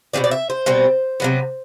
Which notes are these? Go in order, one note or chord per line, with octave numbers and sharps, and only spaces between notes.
B2 G3 C4 D5
D5
E5
C5
B2 G3 C4
C3 F#3 B3